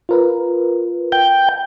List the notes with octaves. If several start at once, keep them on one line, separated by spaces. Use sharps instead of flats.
F4 A#4 B4
G5